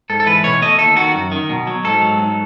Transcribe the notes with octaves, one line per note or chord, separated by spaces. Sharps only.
G#2 A4
A4
E3 B4
B2 C#5
A3 D#5
D#2 A4
D#3 F#4
F#2
D#3
B2
F#3
G#2 A4
F#3
G#2